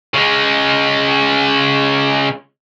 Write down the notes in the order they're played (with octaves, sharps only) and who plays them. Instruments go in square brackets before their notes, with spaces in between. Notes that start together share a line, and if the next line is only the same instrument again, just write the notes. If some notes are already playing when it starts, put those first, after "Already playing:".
[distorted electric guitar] C#3 G#3